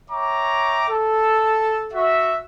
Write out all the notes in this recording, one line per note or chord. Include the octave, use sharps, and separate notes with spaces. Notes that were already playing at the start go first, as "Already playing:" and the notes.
C#5 E5 G5 A#5 D6
A4
F#4 E5